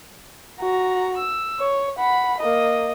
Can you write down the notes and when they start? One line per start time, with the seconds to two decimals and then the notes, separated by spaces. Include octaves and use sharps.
0.60 F#4 A#5
1.17 E6
1.59 C#5
1.98 F#5 B5
2.40 A#3 D#5